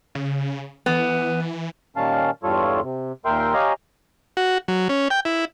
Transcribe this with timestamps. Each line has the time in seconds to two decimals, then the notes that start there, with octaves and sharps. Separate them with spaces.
0.15 C#3
0.86 E3 B3
1.96 A#2 D#3 G3 C#4 F5 A5
2.43 E2 G2 G3 F4 A4 C#5
2.83 C3
3.25 D#2 A#2 A#4 E5 G5 C6
3.54 G4 C#5 D#5 F5 G#5 A#5
4.37 F#4
4.68 F#3
4.89 C#4
5.10 G5
5.25 E4